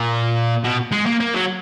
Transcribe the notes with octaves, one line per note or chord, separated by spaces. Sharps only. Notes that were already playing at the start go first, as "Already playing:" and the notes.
Already playing: A#2
B2
G#3
A#3
A#3
F#3